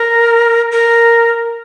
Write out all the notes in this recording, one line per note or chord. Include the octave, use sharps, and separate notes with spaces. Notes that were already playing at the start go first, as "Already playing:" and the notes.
Already playing: A#4
A#4